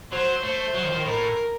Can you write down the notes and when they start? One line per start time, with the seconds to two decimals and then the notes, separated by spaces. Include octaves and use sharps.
0.12 F#3 C5
0.43 A3 C5
0.74 F#3
0.84 D#3
0.90 F3
0.95 D#3
1.05 A2 A#4